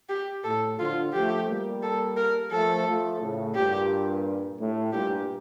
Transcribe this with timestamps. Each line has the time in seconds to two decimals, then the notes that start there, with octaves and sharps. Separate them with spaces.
0.09 G4
0.44 A2 A4
0.79 D3 F3 F4
1.13 F3 A3 G4
1.47 G3 A#3
1.83 A4
2.17 A#4
2.51 F3 A3 A4
2.86 F3 A3
3.20 A2 C#3
3.55 G2 A#2 G4
4.59 A2
4.93 G2 A#2 G4